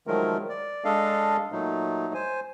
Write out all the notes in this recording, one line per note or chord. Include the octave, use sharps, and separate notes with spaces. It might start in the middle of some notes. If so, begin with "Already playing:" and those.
D#3 F3 F#3 G#3 A3 A#4
D5
G#3 D4 A4 D#5 F5
A#2 F#3 A3 D#4
C5 G#5